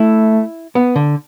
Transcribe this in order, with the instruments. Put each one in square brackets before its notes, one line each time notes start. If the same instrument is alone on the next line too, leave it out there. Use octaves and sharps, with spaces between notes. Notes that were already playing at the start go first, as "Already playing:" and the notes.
Already playing: [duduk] A3 [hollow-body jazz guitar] E4
[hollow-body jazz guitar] B3
D3